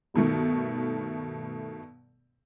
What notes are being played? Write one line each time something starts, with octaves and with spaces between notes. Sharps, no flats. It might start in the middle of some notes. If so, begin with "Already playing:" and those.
G2 B2 D#3 A3